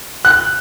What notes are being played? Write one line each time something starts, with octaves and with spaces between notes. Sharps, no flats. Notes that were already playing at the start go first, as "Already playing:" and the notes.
F#6